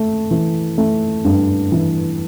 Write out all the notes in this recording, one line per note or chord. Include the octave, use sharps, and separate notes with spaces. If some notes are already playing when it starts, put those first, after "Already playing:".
Already playing: A3
E3
A3
G2
E3